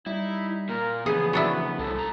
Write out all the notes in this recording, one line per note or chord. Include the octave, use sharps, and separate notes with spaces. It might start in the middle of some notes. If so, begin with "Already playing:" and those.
G3 D#4 E4
A#2 A#4
F2 C#3 E3 B3 G#4
F#3 D4 E4
C2 C3 G#3 A4
A2 A#5